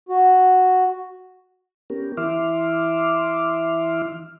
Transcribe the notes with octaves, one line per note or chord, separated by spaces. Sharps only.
F#4
B3 C#4 G4 A#4
E3 E4 E5 C6 D6 F6